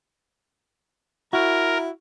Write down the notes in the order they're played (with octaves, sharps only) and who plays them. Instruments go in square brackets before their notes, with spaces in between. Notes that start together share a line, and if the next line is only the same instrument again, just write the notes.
[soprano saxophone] E4 [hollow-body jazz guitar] F#4 [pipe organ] A#4